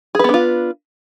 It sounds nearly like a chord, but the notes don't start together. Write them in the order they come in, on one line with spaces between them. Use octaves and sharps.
G#4 B4 B3 D4 F4